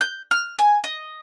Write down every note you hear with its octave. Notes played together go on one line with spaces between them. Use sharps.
G6
F6
G#5
D#5